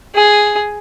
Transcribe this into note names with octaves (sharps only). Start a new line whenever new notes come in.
G#4